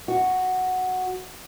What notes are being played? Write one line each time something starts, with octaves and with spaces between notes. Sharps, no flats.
F#4